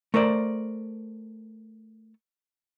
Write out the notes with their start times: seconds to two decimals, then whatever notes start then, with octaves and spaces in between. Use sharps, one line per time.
0.14 A3 A#4 C5 D5